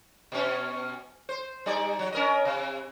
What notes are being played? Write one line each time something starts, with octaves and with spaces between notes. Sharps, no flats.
B2 C#4
C5
G3 D#4 D5
F#3
C#4 A#4 D#5
C3